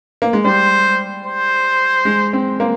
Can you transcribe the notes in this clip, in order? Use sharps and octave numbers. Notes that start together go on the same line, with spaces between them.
A#3
G#3
G3 C5
C5
G#3
C4
A#3